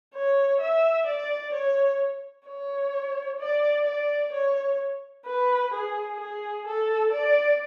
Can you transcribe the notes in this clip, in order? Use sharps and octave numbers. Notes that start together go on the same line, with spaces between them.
C#5
E5
D5
C#5
C#5
D5
D5
C#5
B4
G#4
G#4
A4
D5